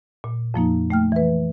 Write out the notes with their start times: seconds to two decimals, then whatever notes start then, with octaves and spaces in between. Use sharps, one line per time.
0.24 A#2
0.54 F2 F3 A#3 D#4
0.90 A3 G5 F6
1.12 E3 B4